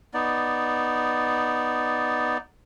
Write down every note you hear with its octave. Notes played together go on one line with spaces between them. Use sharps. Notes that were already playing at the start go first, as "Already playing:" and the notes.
B3 D#4 D5